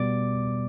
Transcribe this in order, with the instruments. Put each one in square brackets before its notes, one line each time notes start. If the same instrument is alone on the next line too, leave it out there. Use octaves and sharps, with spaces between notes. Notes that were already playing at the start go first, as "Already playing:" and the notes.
Already playing: [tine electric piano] B2 G3 B3 D5 D6